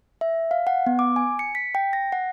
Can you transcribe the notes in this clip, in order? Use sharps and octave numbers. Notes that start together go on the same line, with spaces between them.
E5
F5
F#5
B3
D6
G#5
C#7
B6
G5
A#6
F#5